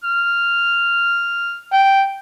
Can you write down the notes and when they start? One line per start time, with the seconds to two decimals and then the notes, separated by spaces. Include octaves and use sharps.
0.04 F6
1.73 G5